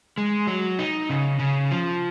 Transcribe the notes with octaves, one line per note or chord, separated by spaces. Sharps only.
G#3
F#3
D#4
C#3
C#3
F3